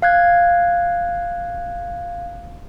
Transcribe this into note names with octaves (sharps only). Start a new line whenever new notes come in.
F5 F#6 G#6